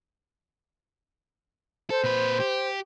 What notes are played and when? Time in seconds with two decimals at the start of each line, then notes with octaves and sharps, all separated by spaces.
1.90 A4 C5
2.04 A#2 B4
2.40 G4